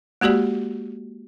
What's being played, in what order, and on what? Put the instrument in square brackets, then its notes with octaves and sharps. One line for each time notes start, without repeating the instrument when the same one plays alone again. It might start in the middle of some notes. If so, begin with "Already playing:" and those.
[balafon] G#3 A#3 F#4 G4 D5